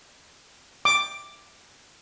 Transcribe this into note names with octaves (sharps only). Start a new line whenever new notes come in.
D6